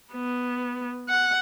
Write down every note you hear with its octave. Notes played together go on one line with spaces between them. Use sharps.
B3
F#5